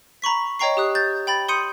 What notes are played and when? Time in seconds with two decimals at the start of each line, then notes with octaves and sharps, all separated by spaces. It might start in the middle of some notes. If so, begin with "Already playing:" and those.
0.22 A#5 B5 C#6 B6
0.59 C#5 D#5 G5 A#5 C#6 C7
0.77 G4 D#6 F#6
0.95 G6 A6
1.27 G5 B5 A6
1.48 C6 D#6 G6 C#7 D#7